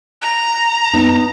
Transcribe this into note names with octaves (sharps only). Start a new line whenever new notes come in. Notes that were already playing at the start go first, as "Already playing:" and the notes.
A#5
B3 D#4